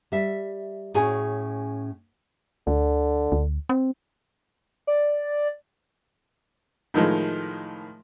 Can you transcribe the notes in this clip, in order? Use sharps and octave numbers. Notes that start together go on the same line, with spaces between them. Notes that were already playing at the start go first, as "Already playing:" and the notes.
G3 E5
A2 C#4 F#4 G#4 G#5
D2 D3
D2
C4
D5
A2 D#3 F3 G#3